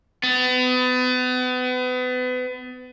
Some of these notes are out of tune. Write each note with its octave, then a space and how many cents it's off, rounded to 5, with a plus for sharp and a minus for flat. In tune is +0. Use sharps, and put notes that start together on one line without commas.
B3 +35